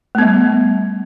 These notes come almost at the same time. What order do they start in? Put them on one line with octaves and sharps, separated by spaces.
A3 B3 G3